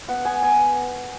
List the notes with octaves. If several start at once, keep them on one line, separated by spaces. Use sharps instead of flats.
B3 F#5
B3 G#5
B3 G#5